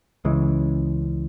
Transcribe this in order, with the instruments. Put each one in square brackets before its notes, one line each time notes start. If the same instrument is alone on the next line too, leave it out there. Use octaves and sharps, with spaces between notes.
[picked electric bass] C#2 C#3 E3 G#3